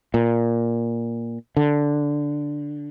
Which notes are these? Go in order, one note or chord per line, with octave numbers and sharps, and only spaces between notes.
A#2
D3